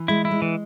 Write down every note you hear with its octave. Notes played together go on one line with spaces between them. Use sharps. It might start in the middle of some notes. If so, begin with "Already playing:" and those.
Already playing: E3
G#3 E4
E4
G#3
E3